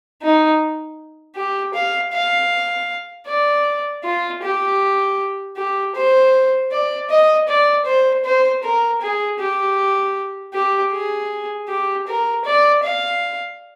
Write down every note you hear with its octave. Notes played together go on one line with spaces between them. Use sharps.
D#4
G4
F5
F5
D5
F4
G4
G4
C5
D5
D#5
D5
C5
C5
A#4
G#4
G4
G4
G#4
G4
A#4
D5
F5